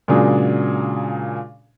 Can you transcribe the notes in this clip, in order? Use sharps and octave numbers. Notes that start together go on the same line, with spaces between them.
A#2 C#3 F#3 G#3 D4 G#4